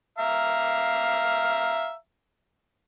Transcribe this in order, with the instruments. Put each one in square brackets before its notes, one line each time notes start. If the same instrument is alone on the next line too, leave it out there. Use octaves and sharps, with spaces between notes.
[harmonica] E5 F5 A#5